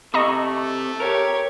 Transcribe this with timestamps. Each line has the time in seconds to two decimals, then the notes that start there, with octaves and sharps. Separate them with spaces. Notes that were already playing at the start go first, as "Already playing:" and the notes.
0.14 C3 A3 E4 D#5 A#5 C#6
1.00 G4 A#4 C#5